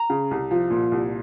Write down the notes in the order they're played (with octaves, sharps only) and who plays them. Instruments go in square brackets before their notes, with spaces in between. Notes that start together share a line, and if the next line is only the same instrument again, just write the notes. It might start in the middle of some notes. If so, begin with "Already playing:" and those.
Already playing: [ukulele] A#5
[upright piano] C#3
C2
F3
A#2
C2